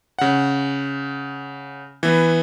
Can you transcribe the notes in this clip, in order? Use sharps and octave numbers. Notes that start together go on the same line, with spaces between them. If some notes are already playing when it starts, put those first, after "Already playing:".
C#3 F#5
E3 B3